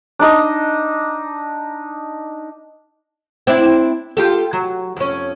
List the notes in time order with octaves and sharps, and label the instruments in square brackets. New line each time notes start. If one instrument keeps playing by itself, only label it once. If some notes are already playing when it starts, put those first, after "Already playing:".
[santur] D4 D#4 D#5
[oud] C4 D4 E4
F4 G4 A4
F#3
F2 C#4